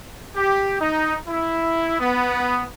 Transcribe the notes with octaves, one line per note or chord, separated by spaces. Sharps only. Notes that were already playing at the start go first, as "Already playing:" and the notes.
G4
D#4
E4
B3